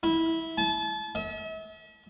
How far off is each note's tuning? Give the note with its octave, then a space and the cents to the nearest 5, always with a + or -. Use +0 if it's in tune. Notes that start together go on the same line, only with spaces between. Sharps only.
E4 -15
A5 -35
E5 -40